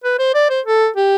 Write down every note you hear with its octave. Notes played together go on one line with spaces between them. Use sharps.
B4
C5
D5
C5
A4
G4